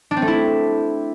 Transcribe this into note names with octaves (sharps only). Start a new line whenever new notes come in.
D4
C4
A3
E4